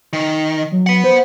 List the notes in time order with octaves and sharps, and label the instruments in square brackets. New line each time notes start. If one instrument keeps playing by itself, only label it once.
[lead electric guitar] D#3
[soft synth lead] F#3
[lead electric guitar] B4 F#5
[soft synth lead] C5